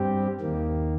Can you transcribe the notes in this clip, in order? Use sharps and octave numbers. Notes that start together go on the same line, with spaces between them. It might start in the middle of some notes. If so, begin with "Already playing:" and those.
Already playing: G2 G3 C4 G4
D#2 D#3 A#3